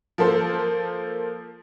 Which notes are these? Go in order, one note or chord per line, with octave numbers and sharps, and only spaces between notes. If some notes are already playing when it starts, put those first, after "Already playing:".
F3 A#3 A4 C5